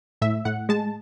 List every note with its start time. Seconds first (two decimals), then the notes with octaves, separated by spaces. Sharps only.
0.22 A2 E5
0.45 A2 F#5
0.69 G#3 A5